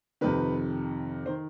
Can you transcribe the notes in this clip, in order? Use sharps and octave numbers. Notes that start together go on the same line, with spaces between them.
F2 C3 D#3 B4
D#3 C5